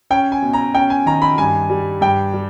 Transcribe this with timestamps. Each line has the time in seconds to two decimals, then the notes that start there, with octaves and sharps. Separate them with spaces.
0.10 C#4 G5
0.32 G#5
0.42 B2
0.53 A#5
0.75 C#4 G5
0.90 G#5
1.06 D#3 A#5
1.22 B5
1.38 G2 G#5
1.70 G3
2.01 G2 G5
2.34 G3